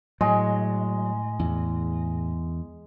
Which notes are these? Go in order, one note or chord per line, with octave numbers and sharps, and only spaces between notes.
A2 F#3 G#3 D#5
E2